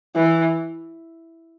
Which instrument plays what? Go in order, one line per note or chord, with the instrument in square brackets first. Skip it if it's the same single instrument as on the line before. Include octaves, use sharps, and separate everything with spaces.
[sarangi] E3